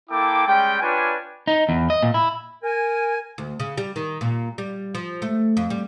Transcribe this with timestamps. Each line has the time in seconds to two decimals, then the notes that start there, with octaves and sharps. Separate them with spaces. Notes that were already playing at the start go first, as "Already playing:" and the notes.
0.10 A#3 E4 A4 G5 D6
0.47 G3 G#3 C#4 G5
0.82 D4 F4 G4 B4 C#5 G#5
1.47 D#4
1.69 E2
1.90 D#5
2.03 A#2
2.14 E4
2.63 A#4 G#5
3.38 D2
3.60 C#3
3.78 G3
3.96 D#3
4.21 A#2
4.58 G3
4.95 F3
5.22 A3
5.57 F2
5.70 G3